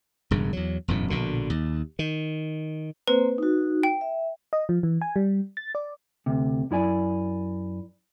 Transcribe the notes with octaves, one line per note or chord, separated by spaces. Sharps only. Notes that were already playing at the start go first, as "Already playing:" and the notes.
E1 G2 C#3
E2 F#3
E1 F#2 A2
A#1 B2 D3
D#2
D#3
A#3 C4 B4 C5
D#4 F#4
G5
E5
D#5
F3
E3
G#5
G3
A6
D5
D2 C3
F#2 E4 D5 G#5